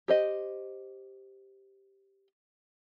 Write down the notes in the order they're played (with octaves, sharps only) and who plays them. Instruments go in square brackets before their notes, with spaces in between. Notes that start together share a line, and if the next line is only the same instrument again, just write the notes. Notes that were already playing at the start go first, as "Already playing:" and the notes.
[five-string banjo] G4 C5 D#5